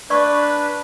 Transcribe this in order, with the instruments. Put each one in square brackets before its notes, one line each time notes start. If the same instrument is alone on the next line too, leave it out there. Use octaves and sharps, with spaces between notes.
[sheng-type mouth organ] D4 B4 [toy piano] D5 C#6